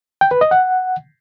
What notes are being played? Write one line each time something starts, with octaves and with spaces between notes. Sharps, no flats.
G5
B4
D#5
F#5